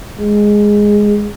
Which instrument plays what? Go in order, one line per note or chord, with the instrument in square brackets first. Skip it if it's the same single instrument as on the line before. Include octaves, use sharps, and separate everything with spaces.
[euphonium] G#3